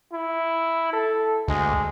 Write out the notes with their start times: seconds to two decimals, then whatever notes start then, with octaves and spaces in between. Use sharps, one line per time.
0.13 E4
0.93 A4
1.48 D2 G#3